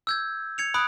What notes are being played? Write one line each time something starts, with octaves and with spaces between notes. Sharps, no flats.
E6 G6 G#6
G#6 C#7 F7
B5 D#6 F#6 D7